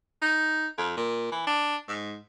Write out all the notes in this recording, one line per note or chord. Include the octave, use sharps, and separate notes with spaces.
D#4
F2
A#2
E3
D4
G#2